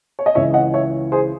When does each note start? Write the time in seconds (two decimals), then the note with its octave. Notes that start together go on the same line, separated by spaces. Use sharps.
0.19 C#5
0.26 D#5
0.35 C#2 C#3 E3 C#5 E5
0.54 D#5 F#5
0.74 C#5 E5
1.12 G#4 C5